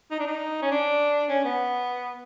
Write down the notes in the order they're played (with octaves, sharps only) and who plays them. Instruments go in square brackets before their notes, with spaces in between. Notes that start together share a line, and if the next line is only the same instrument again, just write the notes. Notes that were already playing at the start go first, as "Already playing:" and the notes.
[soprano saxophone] D#4
D4
D#4
C#4
D4
C#4
B3